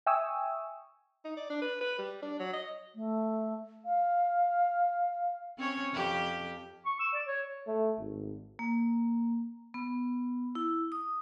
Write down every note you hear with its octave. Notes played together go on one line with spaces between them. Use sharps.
E5 G5 G#5 C#6 D#6 E6
D#4
D5
D4
B4
B4
G3
D4
F#3
D#5
A3
F5
C4 C#4 C#5
F2 G4
C#6
E6
D5
C#5
A3
G#1
A#3
B3
E4
D#6